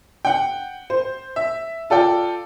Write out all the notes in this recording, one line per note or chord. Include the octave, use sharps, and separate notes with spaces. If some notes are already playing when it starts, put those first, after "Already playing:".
F#5 G5
C5
E5
F4 A4 D5 G5